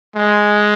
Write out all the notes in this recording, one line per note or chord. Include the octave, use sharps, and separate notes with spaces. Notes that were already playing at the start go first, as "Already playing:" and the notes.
G#3